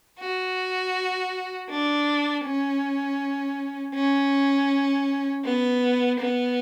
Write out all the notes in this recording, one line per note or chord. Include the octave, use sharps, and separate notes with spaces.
F#4
D4
C#4
C#4
B3
B3